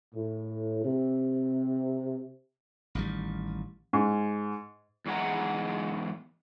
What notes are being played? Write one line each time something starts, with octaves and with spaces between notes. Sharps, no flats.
A2
C3
A1 D#3 G3
G#2
E2 G#2 G#3 F#5 A#5